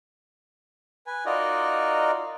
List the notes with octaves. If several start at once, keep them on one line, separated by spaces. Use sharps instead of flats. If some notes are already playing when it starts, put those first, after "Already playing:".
B4 G#5
D#4 F4 F#4 A#4 D5 D#5